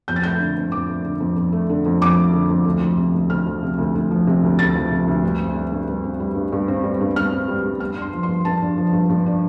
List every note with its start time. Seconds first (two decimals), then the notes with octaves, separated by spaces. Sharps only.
0.08 F2 G6
0.16 A6
0.23 A3 G6
0.40 D3
0.56 F2
0.72 F2 D6
0.88 A3
1.05 D3
1.20 F2
1.36 F2
1.52 A3
1.69 D3
1.85 F2
2.01 F2 D6
2.17 A3
2.33 D3
2.49 F2
2.66 D2
2.81 F3
2.97 C3
3.14 D2
3.30 D2 F6
3.47 F3
3.63 C3
3.78 D2
3.95 D2
4.11 F3
4.27 C3
4.43 D2
4.59 D2 A6
4.75 F3
4.91 C3
5.07 D2
5.23 G2
5.40 C4
5.55 G3
5.72 G2
5.88 G2
6.04 C4
6.20 G3
6.35 G2
6.53 G2
6.68 C4
6.84 G3
7.01 G2
7.16 G2 F6
7.32 C4
7.48 G3
7.64 G2
7.80 G2 F6
7.97 D4 C6
8.13 F3
8.23 C6
8.28 G2
8.45 G2 A5
8.62 D4
8.77 F3
8.93 G2
9.09 G2
9.26 D4